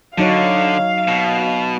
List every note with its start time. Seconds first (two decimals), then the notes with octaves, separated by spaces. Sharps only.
0.18 D3 F#3 D#4 C#5 F5
1.08 B2